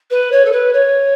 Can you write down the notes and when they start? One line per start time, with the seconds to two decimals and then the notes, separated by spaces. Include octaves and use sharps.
0.10 B4
0.32 C#5
0.45 A4
0.51 B4
0.73 C#5